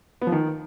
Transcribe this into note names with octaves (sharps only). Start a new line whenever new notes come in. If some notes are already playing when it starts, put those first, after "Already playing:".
B3
F3
D#3